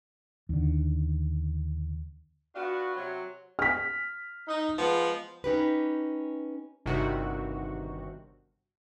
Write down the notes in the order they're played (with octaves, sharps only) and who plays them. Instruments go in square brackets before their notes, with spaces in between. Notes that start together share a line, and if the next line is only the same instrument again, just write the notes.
[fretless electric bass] D#2 D3
[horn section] B3 D4 F4 F#4
C3 F#3
[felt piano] F6 B6
[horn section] D#4
F3 G#3 B3
[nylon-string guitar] C#4 D#4 G4 B4
[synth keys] G1 C3 D#3 F#4